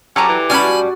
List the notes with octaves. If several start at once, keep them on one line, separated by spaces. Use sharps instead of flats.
F#3 C#4 G4 A4 D5 A5 A#5
E3
G3 C#4 F#4 G#5 A5 B5